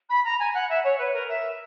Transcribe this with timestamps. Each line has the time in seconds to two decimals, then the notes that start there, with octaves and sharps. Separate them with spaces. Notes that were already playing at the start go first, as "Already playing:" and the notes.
0.09 B5
0.24 A#5
0.39 G#5
0.54 F#5
0.69 E5
0.84 C#5
0.98 B4
1.13 A#4
1.29 E5